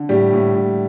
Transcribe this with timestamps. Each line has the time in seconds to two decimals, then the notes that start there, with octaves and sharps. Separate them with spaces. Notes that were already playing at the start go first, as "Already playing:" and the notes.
Already playing: D3
0.09 A2 G3 G4
0.33 A2
0.55 A2